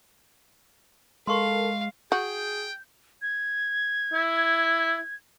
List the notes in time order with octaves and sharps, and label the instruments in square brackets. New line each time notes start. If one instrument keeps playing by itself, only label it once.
[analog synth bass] G#3 [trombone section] A4 A#4 [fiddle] F5 [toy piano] C6 C#6
[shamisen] F#4 [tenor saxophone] G#4 [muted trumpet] G5 [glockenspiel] G6
[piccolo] G#6
[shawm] E4